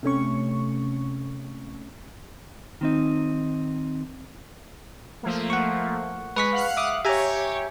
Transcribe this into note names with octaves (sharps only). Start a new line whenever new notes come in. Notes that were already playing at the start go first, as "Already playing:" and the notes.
C3 A3 C#4 C#6
D#3 C4 D#4
F3 A3 A#3
F#5 C#6
G#3 B4 C#6 B6
F5 F#5 F#6
E5 D6 D#6
G4 C#5 E5 G#5 A#5